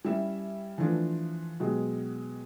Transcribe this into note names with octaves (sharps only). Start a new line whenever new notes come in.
G3 C#4 E4 E5
E3 F3 A3 D4 F4
B2 F#3 G#3 G4